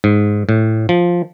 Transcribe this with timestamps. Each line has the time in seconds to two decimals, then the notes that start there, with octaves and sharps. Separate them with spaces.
0.04 G#2
0.49 A2
0.89 F3